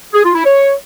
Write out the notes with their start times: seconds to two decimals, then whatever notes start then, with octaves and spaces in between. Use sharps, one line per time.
0.14 G#4
0.24 F4
0.35 E4
0.45 C#5